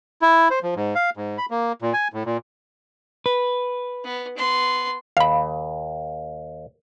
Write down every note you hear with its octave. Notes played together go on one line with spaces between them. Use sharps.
E4
C5
F3
G#2
F5
G#2
B5
A#3
A#2
G#5
A2
A#2
B4
B3
B3 C6
D#2 F5 B5